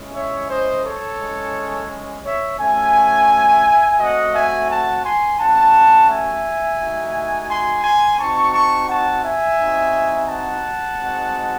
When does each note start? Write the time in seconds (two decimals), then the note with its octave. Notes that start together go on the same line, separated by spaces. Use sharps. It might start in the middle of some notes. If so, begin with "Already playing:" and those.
Already playing: G#3 C#4 E4
0.15 C#5 E5
0.49 C5 D#5
0.84 A4 C#5
1.20 G#3 C#4 E4
2.25 C#5 E5
2.59 A3 C#4 F#4 E5 G#5
3.99 A3 C4 F#4 D#5 F#5
4.34 E5 G#5
4.69 F#5 A5
5.04 G#5 C6
5.39 A3 C#4 F#4 F#5 A5
6.10 E5 G#5
6.79 A3 D#4 F#4
7.49 G#5 C6
7.84 G#5 C6
8.19 C4 D#4 F#4 A5 C#6
8.53 A5 C#6
8.89 F#5 A5
9.24 E5 G#5
9.59 C4 D#4 F#4
10.28 F#5 A5
10.99 G#3 C4 D#4 F#4